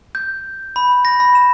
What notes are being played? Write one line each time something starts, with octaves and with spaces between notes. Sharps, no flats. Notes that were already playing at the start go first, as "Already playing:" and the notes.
G6
B5
A#6
B5
E7